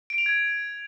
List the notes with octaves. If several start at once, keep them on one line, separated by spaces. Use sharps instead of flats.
D7
F7
G#6